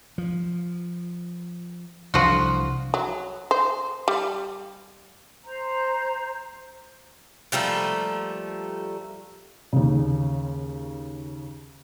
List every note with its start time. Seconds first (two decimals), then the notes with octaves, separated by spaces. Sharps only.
0.18 F3
2.14 C2 E3 F3 D4 F#4
2.94 F#3
3.51 C5
4.08 G3
5.44 C5 A#5
7.52 F3 G3 A3 A#3
9.73 D#2 C#3